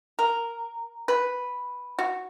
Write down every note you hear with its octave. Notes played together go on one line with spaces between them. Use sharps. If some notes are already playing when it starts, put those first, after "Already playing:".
A#4
B4
F#4